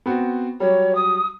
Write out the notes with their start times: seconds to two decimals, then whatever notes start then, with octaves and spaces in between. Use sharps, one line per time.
0.06 B3 C4 F#4
0.60 F#3 G3 C#5
0.95 D#6